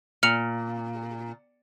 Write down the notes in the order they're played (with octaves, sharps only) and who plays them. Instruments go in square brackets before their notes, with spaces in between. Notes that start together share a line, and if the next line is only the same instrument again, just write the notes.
[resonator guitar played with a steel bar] A#2 [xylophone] F6 C#7 F7